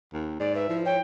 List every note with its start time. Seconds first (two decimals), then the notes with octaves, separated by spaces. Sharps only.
0.13 D#2
0.39 G#2 D5
0.55 B4 E5
0.69 F3 E4
0.85 C#5 G5